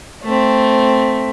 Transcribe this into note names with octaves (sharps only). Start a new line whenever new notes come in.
A3 C4